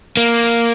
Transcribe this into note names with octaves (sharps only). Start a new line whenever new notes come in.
A#3